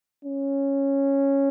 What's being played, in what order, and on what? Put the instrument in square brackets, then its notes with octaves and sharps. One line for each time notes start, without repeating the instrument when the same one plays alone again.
[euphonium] C#4